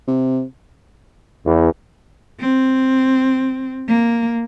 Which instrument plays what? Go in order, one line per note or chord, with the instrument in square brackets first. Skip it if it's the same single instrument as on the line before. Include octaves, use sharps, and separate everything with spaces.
[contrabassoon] C3
[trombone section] E2
[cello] C4
A#3